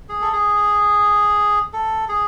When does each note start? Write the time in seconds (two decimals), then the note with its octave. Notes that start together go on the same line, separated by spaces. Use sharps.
0.09 G#4
0.22 A4
0.33 G#4
1.73 A4
2.09 G#4